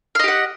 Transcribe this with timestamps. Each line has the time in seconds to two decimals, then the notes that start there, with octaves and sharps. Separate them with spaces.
0.15 F5
0.19 D#5
0.24 G4
0.28 F#5